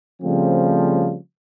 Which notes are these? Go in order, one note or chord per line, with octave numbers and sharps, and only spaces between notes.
C#3 F3 G3 A3 C4